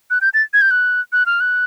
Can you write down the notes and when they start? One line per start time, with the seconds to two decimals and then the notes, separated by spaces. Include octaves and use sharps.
0.10 F#6
0.21 G6
0.34 A6
0.53 G#6
0.62 G6
0.71 F#6
1.12 F#6
1.26 F6
1.40 F#6